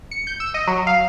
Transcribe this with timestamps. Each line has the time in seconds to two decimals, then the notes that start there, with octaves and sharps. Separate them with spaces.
0.11 C#7
0.27 G6
0.40 E6
0.54 D#5
0.67 F#3
0.87 F5